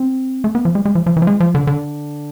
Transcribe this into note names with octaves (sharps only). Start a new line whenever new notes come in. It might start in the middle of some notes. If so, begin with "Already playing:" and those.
Already playing: C4
A3
B3
F3
G#3
G#3
F3
F3
E3
F3
G#3
F3
D3
D3